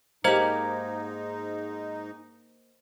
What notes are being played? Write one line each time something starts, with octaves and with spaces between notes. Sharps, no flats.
G#2 A#3 D#4 G4 C5 D#5 G#6